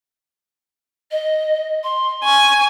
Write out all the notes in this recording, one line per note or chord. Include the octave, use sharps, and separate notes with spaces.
D#5
C6
G#5 C#6